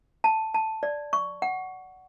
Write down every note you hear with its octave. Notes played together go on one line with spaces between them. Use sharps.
A5
A5
D5
C#6
F#5